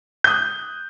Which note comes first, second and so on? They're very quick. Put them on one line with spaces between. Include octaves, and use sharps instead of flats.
G6 D#6 F#6